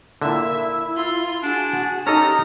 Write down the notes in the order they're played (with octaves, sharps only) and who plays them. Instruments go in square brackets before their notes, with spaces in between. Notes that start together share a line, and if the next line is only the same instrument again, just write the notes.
[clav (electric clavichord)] A#2 D3 [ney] E4 [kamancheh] E5
[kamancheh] F4 C6
[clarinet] D4 [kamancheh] F#4 G#4
[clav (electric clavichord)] C#4 A4 D#5 [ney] D#4 [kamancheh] G4 [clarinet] A#5